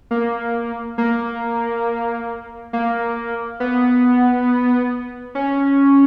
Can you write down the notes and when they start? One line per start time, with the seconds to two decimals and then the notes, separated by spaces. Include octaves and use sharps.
0.11 A#3
0.98 A#3
2.73 A#3
3.60 B3
5.35 C#4